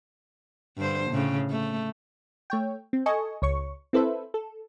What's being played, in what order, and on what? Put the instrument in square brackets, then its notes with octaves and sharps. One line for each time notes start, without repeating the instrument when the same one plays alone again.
[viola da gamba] G2 D3 C5
A2 C#3
A3
[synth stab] A3 C#5 G5
C4
A4 D#5 G#5 C#6
C#2 C#5 C#6
C4 E4 A4 B4 C5 E5
A4